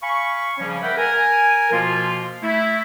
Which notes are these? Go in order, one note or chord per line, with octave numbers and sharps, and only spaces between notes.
F5 G#5 B5 C#6
C#3 F3 G3 A#3 C#4
A#4 B4 E5 F#5 G5 B5
A#4 G#5
B2 F3 A#3 F4
A3 E4